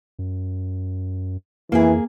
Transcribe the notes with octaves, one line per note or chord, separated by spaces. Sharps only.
F#2
F2 E3 A#3 G#4